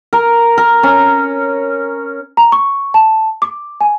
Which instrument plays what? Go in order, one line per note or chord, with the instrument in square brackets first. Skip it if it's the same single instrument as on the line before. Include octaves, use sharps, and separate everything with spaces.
[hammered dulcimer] A#4
A#4
C#4
[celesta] A#5
C#6
A5
D6
G#5